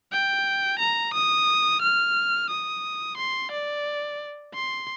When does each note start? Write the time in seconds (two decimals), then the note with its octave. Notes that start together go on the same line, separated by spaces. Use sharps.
0.12 G5
0.79 A#5
1.14 D#6
1.82 F6
2.50 D#6
3.18 C6
3.52 D5
4.54 C6